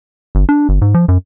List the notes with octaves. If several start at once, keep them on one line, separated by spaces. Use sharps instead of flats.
G1
D4
G1
G#2
F3
F#2